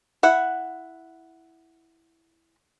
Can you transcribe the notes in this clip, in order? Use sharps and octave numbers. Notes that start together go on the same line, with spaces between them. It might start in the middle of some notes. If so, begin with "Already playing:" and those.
E4 F#5